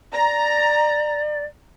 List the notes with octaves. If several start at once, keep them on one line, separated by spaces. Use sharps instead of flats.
D5 A#5